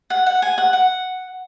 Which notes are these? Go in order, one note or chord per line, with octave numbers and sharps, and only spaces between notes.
F#5
F#5
G#5
F#5
F#5